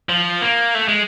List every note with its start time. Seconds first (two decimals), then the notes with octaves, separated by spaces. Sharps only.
0.09 F3
0.42 A#3
0.75 A3
0.88 G#3